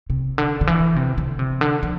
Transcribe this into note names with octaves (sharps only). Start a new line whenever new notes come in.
C3
D3
D3
E3
C3
D3
C3
D3
F3